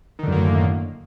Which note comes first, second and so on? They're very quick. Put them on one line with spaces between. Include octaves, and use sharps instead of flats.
D#3 D3 F#2 A#3 A2